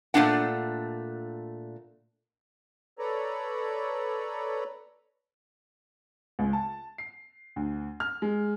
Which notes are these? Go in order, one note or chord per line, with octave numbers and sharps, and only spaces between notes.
A#2 F3 A3 D4 F#5
A4 B4 C#5 D5 A#5
C#2
A5
C7
D2
F6
G#3